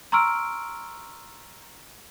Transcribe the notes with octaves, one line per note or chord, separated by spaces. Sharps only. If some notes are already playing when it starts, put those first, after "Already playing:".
A#5 C6 C#6 E6 F6 D7